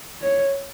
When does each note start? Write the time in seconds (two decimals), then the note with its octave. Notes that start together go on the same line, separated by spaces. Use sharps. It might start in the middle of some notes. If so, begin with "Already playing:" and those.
0.21 C#5